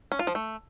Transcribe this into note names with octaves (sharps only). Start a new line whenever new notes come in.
C#4
F4
F3
A3